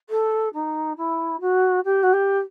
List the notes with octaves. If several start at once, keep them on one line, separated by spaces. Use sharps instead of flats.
A4
D#4
E4
F#4
G4
F#4
G4